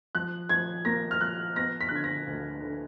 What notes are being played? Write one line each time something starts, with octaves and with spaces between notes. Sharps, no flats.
F3 F#6
F3 G#6
A#3 A#6
F6
F3 F#6
B3 A#6
B6
F#6
D3 G#6
A#6
D2
D3